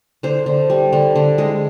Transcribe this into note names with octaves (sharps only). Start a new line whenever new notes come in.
D3 C5
D3
G3
D3
D3
G#3